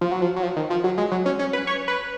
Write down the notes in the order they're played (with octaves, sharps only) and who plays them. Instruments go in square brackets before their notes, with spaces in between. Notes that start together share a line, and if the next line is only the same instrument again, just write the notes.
[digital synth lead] F3
F#3
F3
F#3
F3
D#3
F3
F#3
G#3
F#3
C#4
C#4
B4
C#5
B4